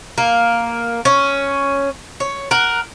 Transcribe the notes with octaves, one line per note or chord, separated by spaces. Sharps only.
A#3
C#4
C#5
A#4 F#5